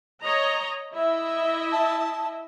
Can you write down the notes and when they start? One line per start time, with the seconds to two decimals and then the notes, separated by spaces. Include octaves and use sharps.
0.22 C#5 D#5 A#5
0.93 E4 D#5 E5
1.72 A5